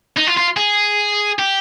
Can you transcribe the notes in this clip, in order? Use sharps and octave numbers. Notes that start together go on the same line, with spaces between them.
D#4
F4
F4
G#4
G4